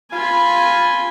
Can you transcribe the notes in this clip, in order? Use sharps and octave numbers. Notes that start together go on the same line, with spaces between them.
F4 G#5 B5